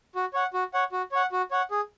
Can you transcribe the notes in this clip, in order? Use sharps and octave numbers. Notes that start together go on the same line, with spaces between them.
F#4
C#5 F#5
F#4
C#5 F#5
F#4
C#5 F#5
F#4
C#5 F#5
G#4